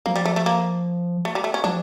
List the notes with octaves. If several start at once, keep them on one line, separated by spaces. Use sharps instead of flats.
F3 A#3
G3
A3
A3
A#3
A3
G3
A3
C#4
F3 D4